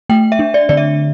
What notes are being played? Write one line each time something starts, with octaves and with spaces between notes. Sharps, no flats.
A3 G5
E5
D4
D5
D3 D5
E5